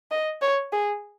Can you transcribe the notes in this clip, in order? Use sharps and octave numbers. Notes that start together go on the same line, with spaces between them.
D#5
C#5
G#4